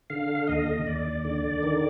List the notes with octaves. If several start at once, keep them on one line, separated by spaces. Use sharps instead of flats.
D3 F5
D#2 D#5
D#2 D5
D3
D#3